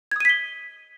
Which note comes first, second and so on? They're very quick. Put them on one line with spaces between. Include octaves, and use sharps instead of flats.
G#6 D#6 D#7 B6 G7